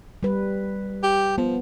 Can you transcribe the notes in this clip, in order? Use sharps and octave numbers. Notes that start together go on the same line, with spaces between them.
G3 B4
G4
F3 B3